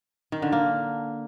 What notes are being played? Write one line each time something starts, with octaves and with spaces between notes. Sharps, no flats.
D#3
D3
A#3